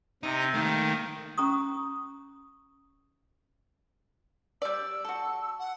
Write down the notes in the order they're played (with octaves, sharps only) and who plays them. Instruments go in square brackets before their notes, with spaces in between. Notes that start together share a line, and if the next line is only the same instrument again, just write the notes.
[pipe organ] C3 [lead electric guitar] D#4
[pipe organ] D#3 [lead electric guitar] A3 A#3
[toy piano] C#4 A#5 C#6 D#6
[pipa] G3 D5 [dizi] E6
[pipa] F#4 A4
[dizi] F#5